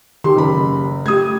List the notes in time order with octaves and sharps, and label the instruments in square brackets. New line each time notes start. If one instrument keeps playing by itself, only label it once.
[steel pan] D#3 G4 A4 [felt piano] C6
[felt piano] F#1 B5
[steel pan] A3 G4 [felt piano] D#6 G#6